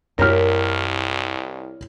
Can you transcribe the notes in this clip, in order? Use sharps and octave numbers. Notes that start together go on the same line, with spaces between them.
C2 F#2 A3 E4 G4 A#4 C#5 F6